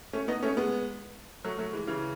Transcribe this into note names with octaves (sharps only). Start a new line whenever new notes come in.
A3 C#4
B3 D#4
A3 C#4
G#3 B3
F#3 A3
F#3 A3
E3 G#3
C#3 E3